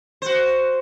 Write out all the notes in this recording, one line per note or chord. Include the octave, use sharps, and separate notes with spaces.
F#4 C5